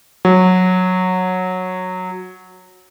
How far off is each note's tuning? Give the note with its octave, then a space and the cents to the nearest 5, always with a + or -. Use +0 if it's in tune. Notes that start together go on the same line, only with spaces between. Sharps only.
F#3 -10